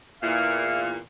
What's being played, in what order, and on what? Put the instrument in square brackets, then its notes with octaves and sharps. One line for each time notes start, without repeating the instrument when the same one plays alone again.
[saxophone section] E2 A#2 [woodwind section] E4 F5